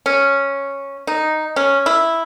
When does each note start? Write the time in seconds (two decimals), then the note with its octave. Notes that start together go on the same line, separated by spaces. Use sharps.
0.06 C#4
1.07 D#4
1.56 C#4
1.86 E4